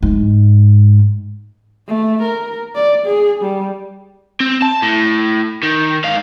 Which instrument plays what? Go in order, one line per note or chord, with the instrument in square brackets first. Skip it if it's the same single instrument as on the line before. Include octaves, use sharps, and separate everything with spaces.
[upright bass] G#2
[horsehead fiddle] A3
A#4
D5
G#4
G3
[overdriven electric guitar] C4
A5
A2
D#3
G#2 F5